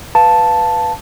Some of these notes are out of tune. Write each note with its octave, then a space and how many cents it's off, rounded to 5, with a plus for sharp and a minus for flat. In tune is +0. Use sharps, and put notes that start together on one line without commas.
B4 +0 F5 +0 A5 +0